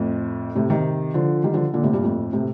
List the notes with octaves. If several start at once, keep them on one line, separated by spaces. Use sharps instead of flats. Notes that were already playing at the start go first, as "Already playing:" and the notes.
Already playing: F2 A2
A2 C3
C3 D#3
D3 F3
D#3 G3
D3 F3
A#2 D3
A2 C3
G2 A#2
F2 A2
A2 C3